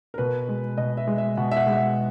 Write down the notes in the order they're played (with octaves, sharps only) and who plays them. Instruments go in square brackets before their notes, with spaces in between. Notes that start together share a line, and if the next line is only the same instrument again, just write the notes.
[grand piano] A#4
B2 B4
G#3
B2 D#5
E5
G#3
E5
B2 F#5
E5
F#5
G#3
F#5
E5